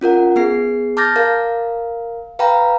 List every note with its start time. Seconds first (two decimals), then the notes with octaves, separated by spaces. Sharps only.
0.01 C#4 F4 A#4 F#5
0.36 B3 G#4 C7
0.97 A5 D6 F6 G6 A6 A#6
1.16 A#4 F5
2.39 B4 F5 G5 A#5 B5